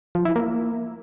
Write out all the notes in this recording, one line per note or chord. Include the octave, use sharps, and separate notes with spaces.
F3
E4
A#3